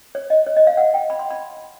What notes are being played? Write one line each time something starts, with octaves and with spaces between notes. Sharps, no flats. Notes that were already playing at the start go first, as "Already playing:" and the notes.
C#5
D#5
C#5
D#5
F5
F#5
G5
B5
C6
B5